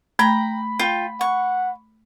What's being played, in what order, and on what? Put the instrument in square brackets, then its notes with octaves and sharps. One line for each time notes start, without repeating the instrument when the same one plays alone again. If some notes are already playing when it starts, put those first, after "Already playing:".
[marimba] A3 [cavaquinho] G5 A#5 [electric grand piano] B5
[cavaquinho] F4 G5
[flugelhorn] F#5 [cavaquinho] C#6